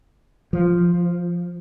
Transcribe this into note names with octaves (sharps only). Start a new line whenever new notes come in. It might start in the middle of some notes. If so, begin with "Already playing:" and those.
F3